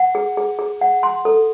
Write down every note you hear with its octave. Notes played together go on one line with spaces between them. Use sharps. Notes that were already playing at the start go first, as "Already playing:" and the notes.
Already playing: F#5
G#4
G#4
G#4
F#5
C6
A4